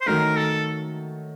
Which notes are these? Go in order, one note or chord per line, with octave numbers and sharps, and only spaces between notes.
C5
D#3 F#3 A3 A#4
A4